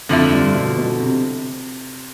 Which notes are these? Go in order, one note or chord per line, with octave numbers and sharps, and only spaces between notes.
F2 D3 F3 A3 E4
F2
G2
B2
B2
C3